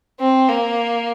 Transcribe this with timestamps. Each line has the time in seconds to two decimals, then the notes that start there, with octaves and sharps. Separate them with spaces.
0.20 C4
0.48 A#3